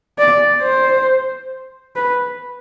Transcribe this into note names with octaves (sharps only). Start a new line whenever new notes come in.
D5
C5
B4